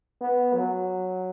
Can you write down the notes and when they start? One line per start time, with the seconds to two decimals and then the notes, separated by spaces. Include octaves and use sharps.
0.21 B3
0.53 F#3